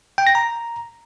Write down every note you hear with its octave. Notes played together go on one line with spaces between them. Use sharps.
G5
A#6
A#5